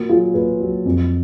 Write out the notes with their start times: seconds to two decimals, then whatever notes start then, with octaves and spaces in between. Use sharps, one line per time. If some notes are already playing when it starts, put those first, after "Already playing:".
Already playing: A#2 F#4 A#4
0.09 F#3 F4 G#4
0.34 A#2 G#4 B4
0.60 F#3
0.85 F2